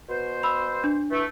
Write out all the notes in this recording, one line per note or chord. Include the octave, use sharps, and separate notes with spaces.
B2 C5
B5 E6
D4
E3 A3